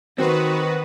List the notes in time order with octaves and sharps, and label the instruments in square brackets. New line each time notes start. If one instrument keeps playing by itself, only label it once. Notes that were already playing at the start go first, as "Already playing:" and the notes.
[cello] D#3 [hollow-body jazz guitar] C4 C5 [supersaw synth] F#4 B4